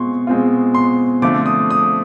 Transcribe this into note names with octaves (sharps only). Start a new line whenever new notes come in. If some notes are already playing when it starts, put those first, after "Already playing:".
Already playing: B2 G#3 C4 F4 C6 C#6
B2 G#3 C4 F4
C6
D3 F3 A3 C4 F4 D6
D#6
D#6